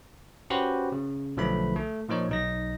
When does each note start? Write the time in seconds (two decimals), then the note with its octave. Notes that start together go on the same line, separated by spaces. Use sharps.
0.50 C#4 F#4 G4 B4 C5
0.92 C#3
1.37 B1 D3 F3 A3 B4 B5
1.76 A3
2.09 A#2 F3 D#4 C#5
2.29 B1 D#4 A#6